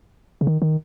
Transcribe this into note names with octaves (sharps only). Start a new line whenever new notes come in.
C#3
D#3
D#3